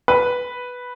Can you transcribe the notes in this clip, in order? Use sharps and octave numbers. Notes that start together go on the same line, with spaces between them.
B4